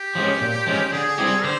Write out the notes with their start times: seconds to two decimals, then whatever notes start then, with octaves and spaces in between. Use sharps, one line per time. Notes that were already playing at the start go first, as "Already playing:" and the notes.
Already playing: G4
0.15 F3 G#3 C#4
0.41 A#2
0.67 F3 G#3 C#4
0.92 D3 G#4
1.18 G3 C4 E4 G4
1.44 D3 C5